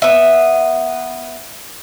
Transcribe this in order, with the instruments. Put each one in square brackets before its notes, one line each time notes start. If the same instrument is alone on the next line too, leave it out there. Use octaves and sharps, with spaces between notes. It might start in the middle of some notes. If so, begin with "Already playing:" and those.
[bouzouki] B3 E5